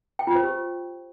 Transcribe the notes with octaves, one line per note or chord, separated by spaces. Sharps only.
G5
F4
C5
G4